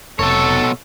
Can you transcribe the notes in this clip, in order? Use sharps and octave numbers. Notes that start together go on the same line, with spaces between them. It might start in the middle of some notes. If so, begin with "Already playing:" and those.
F1 B2 A4 C#5